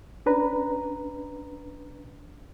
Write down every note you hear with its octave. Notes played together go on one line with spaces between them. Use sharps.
C#4 D4 B4 A#5